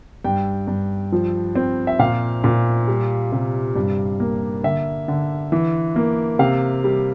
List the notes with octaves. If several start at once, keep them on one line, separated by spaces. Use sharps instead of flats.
G2 G5
G2
F3
C4
E5
A#2 F5
A#2
G3
C3
G2
A#3
D3 E5
D3
E3
A#3
C3 F5
G3